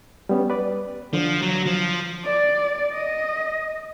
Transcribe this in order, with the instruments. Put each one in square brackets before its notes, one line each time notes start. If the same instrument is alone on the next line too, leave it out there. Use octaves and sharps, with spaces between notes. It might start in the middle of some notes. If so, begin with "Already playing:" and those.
[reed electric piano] G3 B3 C#4
B4 D5
[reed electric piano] D3 [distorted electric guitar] F3
[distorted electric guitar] F#3
F3
[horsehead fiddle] D5
D#5